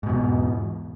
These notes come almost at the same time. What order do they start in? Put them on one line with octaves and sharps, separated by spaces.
G#2 B2 E2